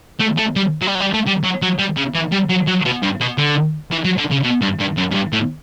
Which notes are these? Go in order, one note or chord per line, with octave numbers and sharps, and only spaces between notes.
A3
A3
G3
F#3
G3
F#3
G3
A3
G3
F#3
F#3
G3
C#3
E3
G3
F#3
F#3
B2
G2
B2
D3
E3
F#3
D3
C#3
B2
G2
G2
F#2
F#2
G2
A2